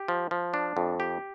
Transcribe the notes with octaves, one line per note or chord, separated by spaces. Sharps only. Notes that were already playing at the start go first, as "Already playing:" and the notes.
Already playing: G4
F3
F3
D4
F2
G4